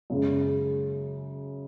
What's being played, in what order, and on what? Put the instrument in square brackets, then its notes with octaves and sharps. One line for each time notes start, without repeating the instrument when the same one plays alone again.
[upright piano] F#2 C#3 G#3